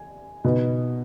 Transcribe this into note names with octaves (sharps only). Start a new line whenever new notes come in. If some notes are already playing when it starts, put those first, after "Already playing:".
Already playing: G#5
B2 B3 D#4